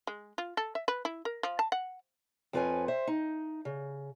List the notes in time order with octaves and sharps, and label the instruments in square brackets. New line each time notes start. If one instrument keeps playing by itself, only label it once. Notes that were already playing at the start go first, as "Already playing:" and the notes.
[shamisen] G#3
F4
A4
E5
B4
E4
A#4
F3
A5
F#5
[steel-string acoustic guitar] F2 C4 F4 B4 C#5 G#5
C5 E5
D#4
C#3